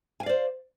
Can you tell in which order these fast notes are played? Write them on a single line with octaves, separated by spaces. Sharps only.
G#5 F5 D5 C5